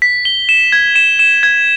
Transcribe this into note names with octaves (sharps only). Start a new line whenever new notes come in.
B6
G7
E7
G#6
E7
E7
G#6